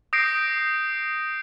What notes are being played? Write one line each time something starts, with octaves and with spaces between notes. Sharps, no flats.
D#6 G6 A#6 C7 D7